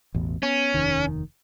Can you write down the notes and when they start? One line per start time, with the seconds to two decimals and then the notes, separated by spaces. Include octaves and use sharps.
0.14 A1 E2 B2
0.43 B3 C#4
0.74 F1 D#2 D#3